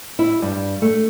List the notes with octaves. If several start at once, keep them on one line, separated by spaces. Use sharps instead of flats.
E4
G2
A3